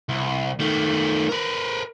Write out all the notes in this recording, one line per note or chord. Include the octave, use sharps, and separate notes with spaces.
C2
D#3 A3
A#4 B4